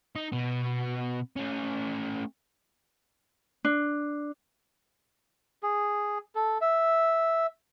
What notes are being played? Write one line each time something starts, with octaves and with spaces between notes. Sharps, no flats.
D#4
B2 B3
A3 C#4
D4
G#4
A4
E5